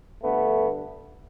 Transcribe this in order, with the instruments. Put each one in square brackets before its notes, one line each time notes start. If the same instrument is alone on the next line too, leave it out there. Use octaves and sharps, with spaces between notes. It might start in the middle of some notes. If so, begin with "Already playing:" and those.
[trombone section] G2 D3 A3 B3